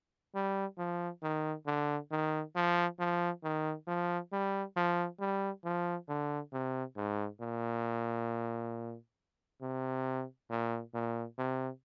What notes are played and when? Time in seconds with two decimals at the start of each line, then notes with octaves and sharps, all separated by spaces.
0.35 G3
0.78 F3
1.23 D#3
1.67 D3
2.11 D#3
2.56 F3
3.00 F3
3.43 D#3
3.87 F3
4.32 G3
4.77 F3
5.20 G3
5.65 F3
6.09 D3
6.53 C3
6.97 G#2
7.41 A#2
9.62 C3
10.50 A#2
10.94 A#2
11.38 C3